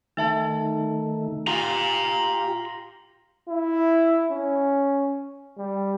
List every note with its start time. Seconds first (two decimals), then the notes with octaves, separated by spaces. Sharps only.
0.17 D#3 A3 D#4 E5 A5
1.47 F4 G4 A#5 C6
3.48 E4
4.31 C#4
5.58 G3